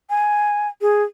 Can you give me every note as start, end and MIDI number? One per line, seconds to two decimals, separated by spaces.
0.10 0.68 80
0.81 1.03 68